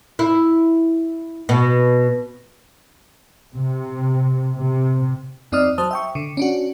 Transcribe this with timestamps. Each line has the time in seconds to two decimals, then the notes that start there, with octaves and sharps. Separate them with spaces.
0.19 E4
1.49 B2
3.54 C3
4.56 C3
5.52 F2 C4 D#4 D5 D#6 F6
5.78 F#3 C5 A5 D#6
5.91 E5 G5 C#6
6.15 D3
6.37 C#4 D4 F#4